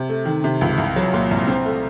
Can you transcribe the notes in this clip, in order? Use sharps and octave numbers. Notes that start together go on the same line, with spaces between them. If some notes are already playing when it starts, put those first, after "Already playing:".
Already playing: C3
A3
D#3
C3
C#2
C2
F#3
A#2
C2
C4
A3